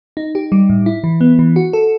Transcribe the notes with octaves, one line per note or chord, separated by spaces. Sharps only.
D#4
G4
G3
A2
E4
E3
B3
E3
F#4
A4